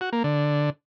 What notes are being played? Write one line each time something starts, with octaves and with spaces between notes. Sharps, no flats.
F#4
A#3
D3